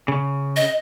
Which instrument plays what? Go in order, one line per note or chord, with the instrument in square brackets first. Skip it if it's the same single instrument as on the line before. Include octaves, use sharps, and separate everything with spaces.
[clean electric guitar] C#3
[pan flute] D#5